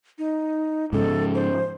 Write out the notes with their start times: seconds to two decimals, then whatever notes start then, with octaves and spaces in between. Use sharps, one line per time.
0.19 D#4
0.93 G#2 C#3 F3 A4
1.34 C5